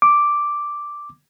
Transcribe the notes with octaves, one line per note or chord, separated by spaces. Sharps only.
D6